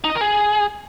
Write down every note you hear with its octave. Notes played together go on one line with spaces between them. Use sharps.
D#4
D#5
A#4
G#4